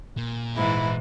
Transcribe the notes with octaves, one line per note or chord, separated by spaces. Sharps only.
A#2
G#2 E3 E4